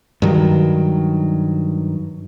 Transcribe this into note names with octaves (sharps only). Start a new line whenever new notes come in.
G2 D#3 F#3